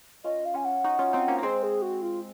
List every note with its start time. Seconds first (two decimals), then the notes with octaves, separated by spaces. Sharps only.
0.24 C#4 F4 D#5
0.45 F5
0.54 C#4 F4 G#5
0.65 F#5
0.84 D#4 F#4
0.99 C#4 F4
1.13 C4 D#4
1.28 A#3 C#4
1.38 A#3
1.42 G#3 C4 C5
1.63 G#4
1.82 F#4
2.02 F4